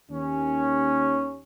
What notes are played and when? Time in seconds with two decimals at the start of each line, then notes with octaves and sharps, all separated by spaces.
0.11 D#2 C#4